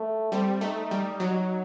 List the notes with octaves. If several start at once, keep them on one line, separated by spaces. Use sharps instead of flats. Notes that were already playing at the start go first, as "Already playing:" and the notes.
Already playing: A3
G3 C4
A3 D#4
G3
F#3